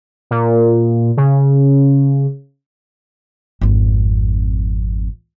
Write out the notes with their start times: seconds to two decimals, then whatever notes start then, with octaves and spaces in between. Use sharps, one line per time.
0.31 A#2
1.17 C#3
3.61 G#1 F2